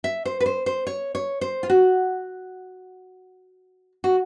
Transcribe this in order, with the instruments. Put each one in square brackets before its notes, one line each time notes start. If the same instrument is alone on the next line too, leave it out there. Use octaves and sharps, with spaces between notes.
[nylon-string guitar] E5
C5
B4
C5
C5
C#5
C#5
C5
F4
F#4
F#4